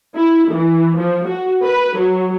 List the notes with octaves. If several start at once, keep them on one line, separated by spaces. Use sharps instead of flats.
E4
E3
F3
F#4
B4
F#3